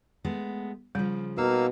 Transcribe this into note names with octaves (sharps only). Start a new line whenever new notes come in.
G#3 A3 B3
C#3 F3 G3
B2 A#3 D#4 F5 E6